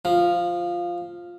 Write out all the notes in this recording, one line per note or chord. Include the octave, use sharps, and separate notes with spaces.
F3